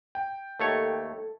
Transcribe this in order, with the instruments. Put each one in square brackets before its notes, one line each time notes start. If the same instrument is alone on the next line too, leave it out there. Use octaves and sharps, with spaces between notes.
[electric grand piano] G5
[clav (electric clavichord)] D#2 A3 C#5 [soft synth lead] A4